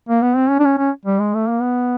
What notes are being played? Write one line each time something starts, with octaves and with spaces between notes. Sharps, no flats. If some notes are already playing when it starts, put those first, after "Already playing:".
A#3
B3
C4
C#4
D4
C#4
C#4
G3
G#3
A3
A#3
B3